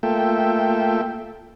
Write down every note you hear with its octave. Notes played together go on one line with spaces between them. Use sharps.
A3 A#3 F4 A4 E5 G5